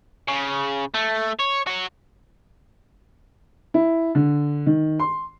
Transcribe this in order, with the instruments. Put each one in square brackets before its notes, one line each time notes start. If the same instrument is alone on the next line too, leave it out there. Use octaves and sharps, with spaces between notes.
[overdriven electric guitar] C#3
A3
C#5
F#4 C#5
[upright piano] E4
D3
D#3
C6